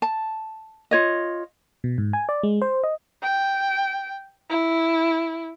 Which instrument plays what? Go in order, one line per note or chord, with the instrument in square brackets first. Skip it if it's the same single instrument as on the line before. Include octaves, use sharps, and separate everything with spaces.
[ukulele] A5
F4 C#5 D#5
[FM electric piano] B2
G#2
G#5
D5
G#3
C5
D#5
[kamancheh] G5
E4